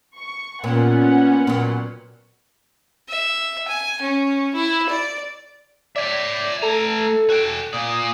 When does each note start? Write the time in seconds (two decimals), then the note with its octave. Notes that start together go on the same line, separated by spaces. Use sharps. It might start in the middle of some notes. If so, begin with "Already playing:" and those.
0.17 C#6
0.64 A#2 B3 C#4 F#5
1.47 A#2 F#3
3.09 E5
3.68 G#5
4.02 C#4
4.54 E4
4.90 D5
5.96 C#5 D5 E5
6.62 A3 A4 A#5
7.30 F#4 G5
7.73 A#2 D5 D#6